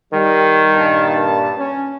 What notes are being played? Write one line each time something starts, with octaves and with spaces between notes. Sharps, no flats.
D#3 G3
G2 A#2 A5
C#4